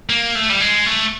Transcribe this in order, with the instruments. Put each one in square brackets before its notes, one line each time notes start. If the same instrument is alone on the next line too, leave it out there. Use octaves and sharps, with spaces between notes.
[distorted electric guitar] A#3
A3
G3
G#3
A3